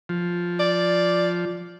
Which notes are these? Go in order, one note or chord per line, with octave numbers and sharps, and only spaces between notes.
F3
D5